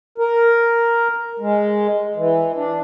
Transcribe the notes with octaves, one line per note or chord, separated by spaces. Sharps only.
A#4
G#3
E3
D4